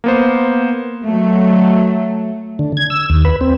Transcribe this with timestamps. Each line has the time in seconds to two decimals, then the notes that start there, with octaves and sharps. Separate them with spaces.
0.04 A#3 B3 C5
1.05 F#3 A3
2.59 D3
2.77 G#6
2.90 E6
3.10 D#2
3.25 B4
3.41 C4